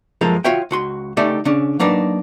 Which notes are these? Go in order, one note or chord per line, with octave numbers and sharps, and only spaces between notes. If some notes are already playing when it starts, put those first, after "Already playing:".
F#2 F3 G#3 A#3 A4 A#5
F4 F#4 C#5 E5 G5
C#2 F#4 C6
C#3 A3 D#4 G4 D5 E5
C#3 C#4 D4
F#3 A#3 D4 D#4 B4